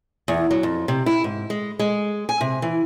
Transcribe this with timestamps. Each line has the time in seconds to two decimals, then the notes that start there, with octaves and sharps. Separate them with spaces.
0.28 E2
0.51 F#3
0.63 F2
0.88 C3
1.06 E4
1.24 G#2
1.50 G#3
1.79 G#3
2.29 G#5
2.41 C3
2.62 E3